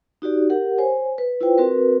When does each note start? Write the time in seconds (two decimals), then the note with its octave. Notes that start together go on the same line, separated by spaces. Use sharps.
0.22 D#4 F#4 G4 D5
0.50 G4 A#4 F#5
0.78 C5 C#5 G#5
1.18 B4
1.41 E4 F4 B4 C5 G5
1.58 C4 F#4 A#4 B4